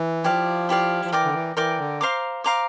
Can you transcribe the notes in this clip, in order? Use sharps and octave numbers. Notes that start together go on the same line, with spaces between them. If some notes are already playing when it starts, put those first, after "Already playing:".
Already playing: E3
F3 E4 G4 D5 F5
E4 G4 D5 F5
F3
E3 A#4 D5 G5 D6
D3
E3
E3 A#4 D5 G5 D6
D3
C5 F5 A#5 D6
C5 F5 A#5 D6